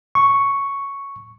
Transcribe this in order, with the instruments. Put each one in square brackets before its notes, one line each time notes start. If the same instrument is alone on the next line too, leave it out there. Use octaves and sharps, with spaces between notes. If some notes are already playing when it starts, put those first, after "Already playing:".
[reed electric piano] C#6